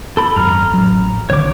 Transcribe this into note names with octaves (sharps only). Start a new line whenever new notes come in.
A4 B5
G#1 F#2 A#5 F6
A1 F#3
B1 D3 D#3 C#5 D6